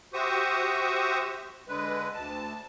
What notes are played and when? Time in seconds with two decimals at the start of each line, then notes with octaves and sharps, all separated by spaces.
0.13 F#4 G4 C5 E5 C#6 D#6
1.68 D3 G#3 B4
2.14 D2 A5